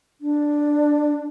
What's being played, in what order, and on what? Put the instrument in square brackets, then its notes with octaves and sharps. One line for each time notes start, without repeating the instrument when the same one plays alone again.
[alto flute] D4